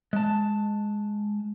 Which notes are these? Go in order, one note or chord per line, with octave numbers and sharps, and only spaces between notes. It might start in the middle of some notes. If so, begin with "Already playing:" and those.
G#3 A5